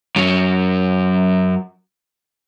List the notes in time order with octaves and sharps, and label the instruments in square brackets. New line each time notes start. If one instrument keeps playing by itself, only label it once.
[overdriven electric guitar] F#2 F#3